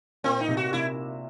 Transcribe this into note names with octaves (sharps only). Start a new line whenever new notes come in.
A#2 C4
D#4
C3
F#4
C3 E4